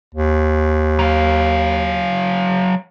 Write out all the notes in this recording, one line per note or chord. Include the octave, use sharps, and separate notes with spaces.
D#2
F#3 F5